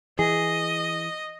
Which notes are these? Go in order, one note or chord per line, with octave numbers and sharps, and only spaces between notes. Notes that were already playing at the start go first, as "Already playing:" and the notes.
E3 G#4 D#5